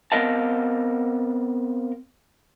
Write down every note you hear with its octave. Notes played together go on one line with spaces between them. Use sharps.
B3 C4 A#4 D#5 F5 A5